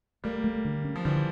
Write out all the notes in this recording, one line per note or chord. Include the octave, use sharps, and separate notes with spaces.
G3 A3 A#3
A3
D3
C#4
F3
D3 E3 G3